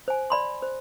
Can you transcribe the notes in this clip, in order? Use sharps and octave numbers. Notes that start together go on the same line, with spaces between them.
C5 G#5
D5 B5 C6
C5